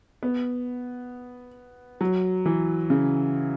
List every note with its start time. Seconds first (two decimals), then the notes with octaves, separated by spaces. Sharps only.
0.23 B3
2.01 F#3
2.46 E3
2.90 C#3